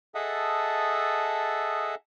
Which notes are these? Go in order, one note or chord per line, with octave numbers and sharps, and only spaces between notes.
G#4 A4 D#5 E5 F#5 A5